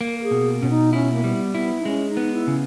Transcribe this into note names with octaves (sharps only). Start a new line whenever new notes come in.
A#3
A#4
G#4
B2
B2 C#4
D#4
C#4 E4
A#3
G3 B3
B3 E4
D#4
G#3 C#4
D#4
B3
E4
C#3